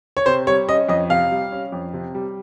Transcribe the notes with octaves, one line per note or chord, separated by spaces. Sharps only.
C#5
C3 C5
G3 C#5
C#4 D#5
F2 D#5
C3 F5
G3
C#4
F2
C3
G3